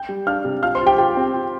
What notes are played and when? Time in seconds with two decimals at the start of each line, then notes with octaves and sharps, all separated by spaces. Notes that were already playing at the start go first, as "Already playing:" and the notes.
Already playing: G5 G6
0.09 G3
0.27 D4 F5 F6
0.45 C3
0.63 F4 F5 F6
0.75 C5 C6
0.81 F4
0.86 G4 G5
0.98 F4 G4 G5
1.17 C4
1.34 F4